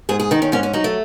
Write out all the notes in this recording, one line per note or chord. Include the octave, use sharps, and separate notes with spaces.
G#2 G#4
G#4
D#3 D#4
C#4
G#2 C#4
C#4
F#3 D#4
A3